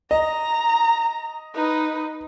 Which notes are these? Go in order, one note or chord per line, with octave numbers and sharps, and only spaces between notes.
D#5 A#5
D#4 B4